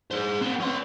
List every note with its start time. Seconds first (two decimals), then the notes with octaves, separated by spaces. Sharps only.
0.11 G#4 C5
0.41 B3 C4
0.60 C#4 C6